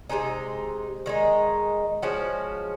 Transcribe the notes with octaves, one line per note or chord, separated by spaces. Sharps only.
C3 F3 G#3 D#4
D#3 G#3 D#4
F3 G#3 C#4 F#4